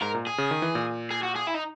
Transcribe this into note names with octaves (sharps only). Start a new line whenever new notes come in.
G#2 A#4
A#2
G#4
C#3
D#3
E3
A#2
G#4
F#4
G#4
E4
D#4